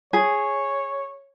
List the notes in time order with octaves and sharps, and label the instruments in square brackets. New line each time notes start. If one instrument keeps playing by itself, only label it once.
[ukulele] G#4 [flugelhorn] C#5